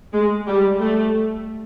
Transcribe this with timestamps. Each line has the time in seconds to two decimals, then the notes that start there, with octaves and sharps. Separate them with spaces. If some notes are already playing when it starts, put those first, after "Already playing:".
0.13 G#3
0.48 G3
0.80 A3